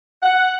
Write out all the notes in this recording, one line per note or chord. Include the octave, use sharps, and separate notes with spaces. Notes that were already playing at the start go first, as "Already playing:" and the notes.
F#5